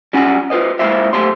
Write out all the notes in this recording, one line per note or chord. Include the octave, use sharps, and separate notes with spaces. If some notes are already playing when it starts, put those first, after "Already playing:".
G3 C#4 F4 F#5 G#5
F4 B4 C5 D#5
G#3 A#3 E4 F4 C5 E5
B1 A3 G4 C5 F5 C6